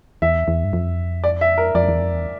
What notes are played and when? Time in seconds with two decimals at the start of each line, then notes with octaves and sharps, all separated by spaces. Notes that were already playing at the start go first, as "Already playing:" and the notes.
0.22 E2 E5
0.48 E2
0.64 G2
0.73 F2
1.24 D5
1.41 E5
1.58 A#4
1.75 F2 D5
1.88 E2
2.00 F2
2.13 E2